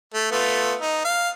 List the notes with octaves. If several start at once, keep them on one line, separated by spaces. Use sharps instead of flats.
A3
A3 B3 F4
D#4
F5